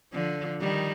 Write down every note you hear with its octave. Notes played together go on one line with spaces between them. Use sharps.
D3 F3
D#3 G3